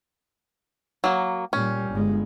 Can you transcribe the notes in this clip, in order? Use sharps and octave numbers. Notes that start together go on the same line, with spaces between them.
F#3 A#3
A#2 G3 C#4
G1 G#3